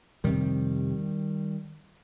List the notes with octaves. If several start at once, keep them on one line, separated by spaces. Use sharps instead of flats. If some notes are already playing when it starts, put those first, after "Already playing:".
F2 C3 D#3 G3